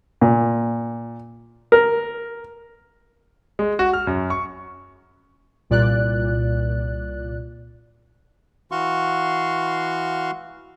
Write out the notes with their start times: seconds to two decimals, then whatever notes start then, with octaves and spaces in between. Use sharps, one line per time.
0.21 A#2
1.72 A#4
3.59 G#3
3.79 F#4
3.93 F6
4.07 F#2
4.30 C#6
5.70 C2 A#2 D5 F#6
8.71 E3 F#4 F5 C6 C#6